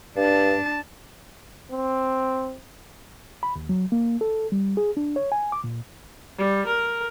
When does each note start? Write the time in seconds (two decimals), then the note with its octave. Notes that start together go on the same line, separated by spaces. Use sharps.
0.17 G2 D4 A5
1.71 C4
3.43 B5
3.56 D#2
3.69 F#3
3.92 A#3
4.21 A4
4.52 G3
4.77 G#4
4.97 D4
5.16 C#5
5.32 G#5
5.52 D6
5.64 A#2
6.38 G3
6.67 A#4